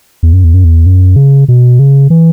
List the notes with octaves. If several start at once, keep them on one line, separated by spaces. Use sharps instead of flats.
E2
F#2
E2
F#2
E2
F#2
C#3
B2
C#3
E3